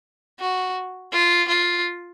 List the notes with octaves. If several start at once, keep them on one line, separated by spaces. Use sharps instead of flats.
F#4
F4
F4